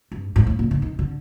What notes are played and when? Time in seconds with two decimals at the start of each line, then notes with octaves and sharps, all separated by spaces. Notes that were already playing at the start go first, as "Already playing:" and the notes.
0.12 G2
0.36 G#2
0.47 A2
0.59 A#2
0.71 D3
0.82 D#3
0.99 D3